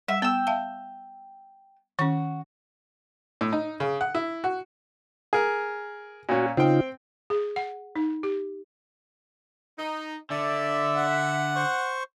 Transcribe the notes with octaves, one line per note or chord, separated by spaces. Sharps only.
G3 E5 F#5
B3 G5 E6
E5 F5 A5
D#3 C#4 F#4
A2
D#4
C#3
F#5
E4
F#4
G#4 A#4
A#2 C#4 F#4
C#3 C4 D#4 F4 G5
G#4
F#5
D#4
G4
D#4
D3 D5 E5
F#5
C5 C#6